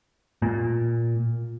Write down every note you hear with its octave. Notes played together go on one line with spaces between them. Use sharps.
A#2